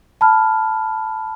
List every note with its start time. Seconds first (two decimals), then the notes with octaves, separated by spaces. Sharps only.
0.21 A5 B5 F6